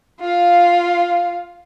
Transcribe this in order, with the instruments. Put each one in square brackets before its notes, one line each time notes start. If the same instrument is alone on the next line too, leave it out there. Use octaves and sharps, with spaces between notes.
[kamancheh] F4 F5